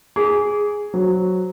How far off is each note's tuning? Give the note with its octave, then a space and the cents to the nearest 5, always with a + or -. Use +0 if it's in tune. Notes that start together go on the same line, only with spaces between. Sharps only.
G#4 +0 D6 -25
F#3 +0 C5 +0